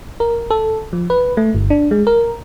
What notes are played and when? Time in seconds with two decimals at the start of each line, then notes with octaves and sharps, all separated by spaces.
0.20 A#4
0.50 A4
0.93 F3
1.10 B4
1.37 A3
1.55 G1
1.70 D4
1.91 G#3
2.07 A#4